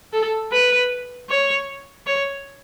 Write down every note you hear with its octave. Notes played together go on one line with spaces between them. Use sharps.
A4
B4
C#5
C#5